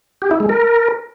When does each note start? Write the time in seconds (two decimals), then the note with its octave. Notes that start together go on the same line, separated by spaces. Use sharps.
0.22 G4
0.31 E4
0.40 G#3
0.49 A#4